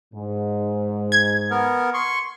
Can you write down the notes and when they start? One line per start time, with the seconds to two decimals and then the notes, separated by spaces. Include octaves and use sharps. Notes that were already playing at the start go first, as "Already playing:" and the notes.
0.14 G#2
1.12 G#6
1.51 B3 A#4
1.94 C6 C#6